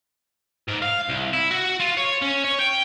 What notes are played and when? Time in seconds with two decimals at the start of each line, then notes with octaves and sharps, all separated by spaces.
0.68 G#2
0.82 F5
1.09 C2
1.33 E4
1.51 F#4
1.80 F4
1.97 C#5
2.22 C#4
2.44 C#5
2.59 G5